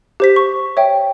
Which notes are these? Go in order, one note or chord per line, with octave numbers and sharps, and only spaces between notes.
G4 C5 B6
C#6
C#5 E5 G5